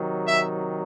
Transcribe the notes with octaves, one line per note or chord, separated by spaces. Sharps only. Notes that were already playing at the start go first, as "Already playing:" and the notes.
Already playing: C3 D#3 F#3
E5